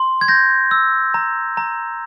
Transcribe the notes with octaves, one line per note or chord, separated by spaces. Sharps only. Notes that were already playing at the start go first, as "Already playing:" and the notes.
Already playing: C6
G#6
G6 A#6
E6
A#5
A#5